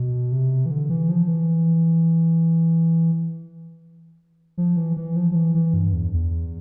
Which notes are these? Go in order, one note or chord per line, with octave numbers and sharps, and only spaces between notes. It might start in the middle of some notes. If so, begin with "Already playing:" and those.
Already playing: B2
C3
E3
D3
E3
F3
E3
F3
E3
E3
F3
F3
E3
E3
G2
E2
E2